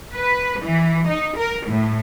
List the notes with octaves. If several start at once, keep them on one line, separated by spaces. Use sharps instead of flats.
B4
E3
D#4
A#4
A2